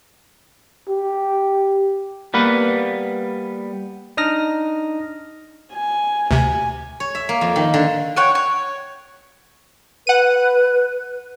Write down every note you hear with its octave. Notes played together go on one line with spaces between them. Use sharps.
G4
G3 A#3 B3 B4
D4 D#4 D#6 F6 A#6
G#5
D2 C3 G#5
C#5
E5
A#3
F2
D#3
D3
C#5 F#5 G5
C#5
B4 F#5 D#7